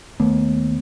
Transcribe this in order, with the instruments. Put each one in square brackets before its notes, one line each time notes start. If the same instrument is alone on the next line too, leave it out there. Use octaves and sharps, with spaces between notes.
[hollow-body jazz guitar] D#2 [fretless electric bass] A3 B3